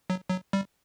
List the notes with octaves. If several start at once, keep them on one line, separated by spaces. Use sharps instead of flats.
F#3
F#3
G3